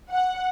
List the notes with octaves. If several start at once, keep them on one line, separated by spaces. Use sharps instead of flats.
F#5